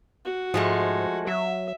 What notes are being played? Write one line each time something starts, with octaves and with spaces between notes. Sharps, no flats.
F#4
G#2 F3 G#3 A3
F#3 E5